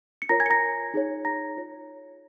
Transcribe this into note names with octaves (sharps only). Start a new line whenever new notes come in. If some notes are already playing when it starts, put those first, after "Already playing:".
C#7
F4 A#4 C#5 A#5 A#6
G#5 G#6
C#7
A#5 A#6
D#4 G#4 C#5
A#5 A#6
F4 C#5